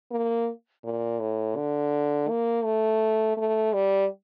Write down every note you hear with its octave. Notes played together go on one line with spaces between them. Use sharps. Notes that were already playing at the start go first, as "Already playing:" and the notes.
A#3
A#2
A2
D3
A#3
A3
A3
G3